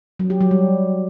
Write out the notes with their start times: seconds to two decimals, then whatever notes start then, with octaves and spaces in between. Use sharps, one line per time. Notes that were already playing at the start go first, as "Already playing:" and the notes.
0.20 F#3
0.30 G4
0.41 F#3
0.51 G3